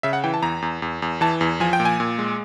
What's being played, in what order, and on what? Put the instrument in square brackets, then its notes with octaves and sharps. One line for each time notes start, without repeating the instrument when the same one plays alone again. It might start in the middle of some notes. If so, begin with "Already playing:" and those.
[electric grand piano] C#3 E5
F#5
E3 G5
A5
E2 A#5
E2
E2
E2
E3 A5
E2
F3 G#5
G5
A#2
G#5
A#2
G#3